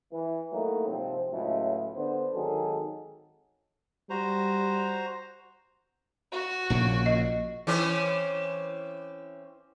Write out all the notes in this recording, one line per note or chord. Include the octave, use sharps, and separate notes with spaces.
E3
F#3 A3 A#3 D#4 E4
G#2 C3 F3 C4
C#2 A2 F#3 G#3 A3 E4
D3 B3 C5
G#1 D#3 F#3 G#4 A4
G3 F#4 C5 A#5
F#4
A#1 A#2 C#3
D#5
E3 C4 C#4